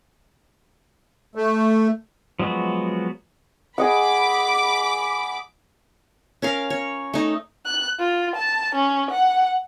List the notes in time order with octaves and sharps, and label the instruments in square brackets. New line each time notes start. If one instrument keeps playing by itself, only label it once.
[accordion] A3
[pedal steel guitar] F3 F#3 G#3 B3 F#4
[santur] G#4 D#5 F#5 [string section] B5 D6
[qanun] C#4 A#4 F5
C#5
A3 D#4
[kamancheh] F#6
F4
A5
C#4
F#5